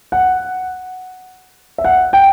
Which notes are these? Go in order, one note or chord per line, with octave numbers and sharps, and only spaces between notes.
F#5
E5
F#5
G5